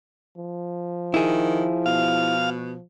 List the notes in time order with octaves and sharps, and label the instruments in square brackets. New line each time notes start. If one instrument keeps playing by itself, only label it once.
[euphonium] F3
[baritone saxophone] D#3 [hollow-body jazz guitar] E4 G#4
[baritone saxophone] B2 [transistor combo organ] F5